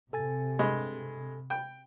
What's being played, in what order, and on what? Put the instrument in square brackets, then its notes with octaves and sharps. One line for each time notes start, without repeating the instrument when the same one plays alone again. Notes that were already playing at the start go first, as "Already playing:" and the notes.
[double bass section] C3 [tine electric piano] A4 G#5 A6
[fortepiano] G2 G#3
G5